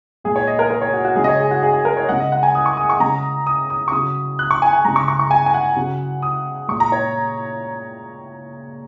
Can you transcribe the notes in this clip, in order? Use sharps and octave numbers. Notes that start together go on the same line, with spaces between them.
A#2 G#3 G#4
C#5
D#5
A#4
A#4
C#5
F#4
F#4
C#3 G#3 G#4
D#5
C#5
G#4
F#4
G#4
G#4
A#4
C#5
C#3 G#3 F#5
D#5
F#5
G#5
D#6
C#6
D#6
C#6
C#3 G#3 A#5
D#6
D#6
C#6
C#3 F#3 D#6
F#6
C#6
G#5
G#5
C#3 G#3 A#5
C#6
C#6
C#6
G#5
G#5
F#5
C#3 F#3
D#6
A#2 G#3 C#6
A#5
C#5